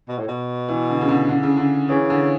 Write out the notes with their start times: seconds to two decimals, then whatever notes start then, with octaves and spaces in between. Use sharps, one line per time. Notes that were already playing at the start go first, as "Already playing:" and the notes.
0.09 B2
0.18 A2
0.28 B2
0.69 E3
0.89 D3
1.01 C#3
1.08 D3
1.29 D3
1.43 C#3
1.57 D3
1.89 C#3 E3
2.10 D3